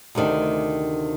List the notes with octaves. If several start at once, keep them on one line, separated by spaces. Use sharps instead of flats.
D2 C3 D#3 A3 D4